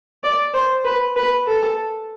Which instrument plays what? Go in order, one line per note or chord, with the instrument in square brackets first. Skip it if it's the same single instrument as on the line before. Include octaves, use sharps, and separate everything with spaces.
[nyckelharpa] D5
C5
B4
B4
A4